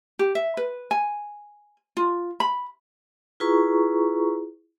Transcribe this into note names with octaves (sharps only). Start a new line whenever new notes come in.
G4
E5
B4
G#5
F4
B5
E4 F4 G#4 B4 A#5 C#6